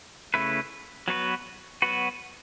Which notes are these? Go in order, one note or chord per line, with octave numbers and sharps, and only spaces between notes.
C#3 A3 E4 B4
F#3 B3 F#4 B4
F#3 B3 F#4 B4